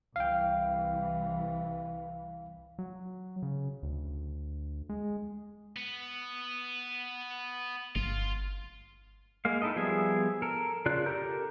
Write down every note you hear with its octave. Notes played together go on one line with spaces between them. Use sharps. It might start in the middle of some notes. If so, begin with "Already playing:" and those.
C2 E3 F5 G5
F#3
C#3
D2
G#3
B3
G1 F4
G#3 A#3 F5
D#4 E4 A4 D#5
F3 G3 B3 G#4 E5
A4 A#4
C#3 F4 D5 F#6
G4 A4 A#4 A#5 G6